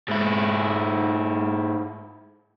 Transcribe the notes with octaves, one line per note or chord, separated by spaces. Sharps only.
G#2 E4